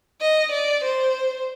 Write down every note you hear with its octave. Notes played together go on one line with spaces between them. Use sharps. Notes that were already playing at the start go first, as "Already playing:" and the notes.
D#5
D5
C5